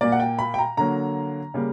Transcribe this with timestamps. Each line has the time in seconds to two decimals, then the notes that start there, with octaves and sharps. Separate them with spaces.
0.01 A#2 A#3 D5
0.12 F#5
0.20 G5
0.39 B5
0.54 G5
0.59 A#5
0.77 D3 F#3 A#3 A#5
1.54 C#3 G3 A#3